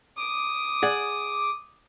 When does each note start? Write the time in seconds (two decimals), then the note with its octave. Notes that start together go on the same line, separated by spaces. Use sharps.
0.17 D6 D#6
0.83 G#4 D5 F#5